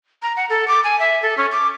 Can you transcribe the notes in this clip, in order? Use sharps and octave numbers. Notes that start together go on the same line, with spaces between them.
A#5
F#5
A4
D6
G#5
E5
A4
C#4
D6